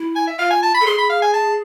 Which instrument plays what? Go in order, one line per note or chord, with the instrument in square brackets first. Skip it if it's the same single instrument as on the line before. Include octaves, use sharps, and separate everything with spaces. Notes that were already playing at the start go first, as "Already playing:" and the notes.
Already playing: [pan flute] E4
[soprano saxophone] G#5
E5
[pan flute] F4 [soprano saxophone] F5
[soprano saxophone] G#5
A5
B5
[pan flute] A4
[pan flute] G#4 [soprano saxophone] C6
[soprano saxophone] B5
F5
G#5
A5